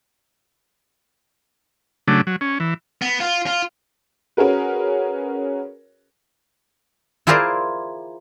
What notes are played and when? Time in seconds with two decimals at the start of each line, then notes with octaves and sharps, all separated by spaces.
2.08 C#3 F#3 A3 D4
2.27 F#3
2.41 C#4
2.60 E3
3.02 B3
3.20 F4
3.47 F4
4.37 C#4 F#4 G#4 A#4 B4
7.27 E4 F4 G#4 A#4 C5 D5